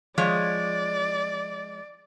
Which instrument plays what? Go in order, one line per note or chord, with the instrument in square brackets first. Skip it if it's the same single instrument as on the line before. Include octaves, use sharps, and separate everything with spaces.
[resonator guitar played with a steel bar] F3 G#3 C#5 [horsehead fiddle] D5